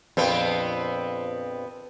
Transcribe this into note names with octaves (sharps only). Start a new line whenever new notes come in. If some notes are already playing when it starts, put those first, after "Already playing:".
A#1 F2 B3 C4